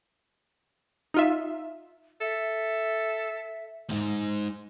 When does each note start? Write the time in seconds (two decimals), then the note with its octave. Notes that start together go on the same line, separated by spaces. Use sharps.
1.14 D#4 F4 E5
2.21 A4 E5
3.89 D2 G#2